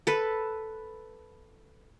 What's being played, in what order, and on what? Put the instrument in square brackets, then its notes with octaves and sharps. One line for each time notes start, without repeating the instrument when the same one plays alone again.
[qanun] A4 B4